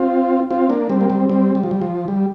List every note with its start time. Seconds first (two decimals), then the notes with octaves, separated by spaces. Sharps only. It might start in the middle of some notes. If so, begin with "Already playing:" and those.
Already playing: C4 F4
0.51 C4 F4
0.70 A#3 D4
0.89 G3 C4
1.01 A#3
1.10 G3 C4
1.29 G3 C4
1.55 G3
1.63 F3
1.71 G3
1.82 F3
2.08 G3